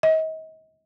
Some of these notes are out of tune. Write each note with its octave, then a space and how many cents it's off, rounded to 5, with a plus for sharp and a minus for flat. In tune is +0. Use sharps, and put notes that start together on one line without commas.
D#5 +35